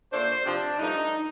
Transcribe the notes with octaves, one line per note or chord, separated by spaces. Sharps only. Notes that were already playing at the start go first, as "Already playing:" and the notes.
A#2 A3 D4 C5
C3 F3 C4 D4
G2 F3 A3 D#4